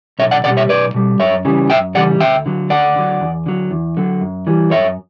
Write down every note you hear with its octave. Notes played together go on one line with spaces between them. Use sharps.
B1 C#5 E5
D5 F#5
B2 G3 D5 F#5
C#5 E5
B1 B4 D5
B2 G3
F#2 C#5 E5
C#3 E3 G3
F#2 E5 G5
C#3 E3 G3 D5 F#5
D2 E5 G5
D3 F#3
D2 D5 F#5
D3 F#3
E2
D3 F#3
E2
D3 F#3
F#2
E3 G3
F#2 C#5 E5